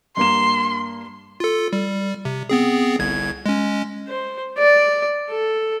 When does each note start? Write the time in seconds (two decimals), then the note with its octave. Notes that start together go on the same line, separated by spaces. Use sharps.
0.17 G2 A#3 C6 E7
1.40 F4 A4
1.73 G3
2.25 C3
2.49 B3 C4 G#4
2.99 G1 C2 G#6
3.46 G#3 C#4
4.07 C5
4.58 D5
5.30 A4